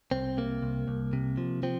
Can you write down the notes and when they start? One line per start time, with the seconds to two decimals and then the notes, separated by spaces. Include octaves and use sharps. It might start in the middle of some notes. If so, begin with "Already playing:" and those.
0.11 C2 C4
0.37 C3 A#3
0.62 C2
0.88 C2
1.13 C3
1.37 F3
1.63 F3 C4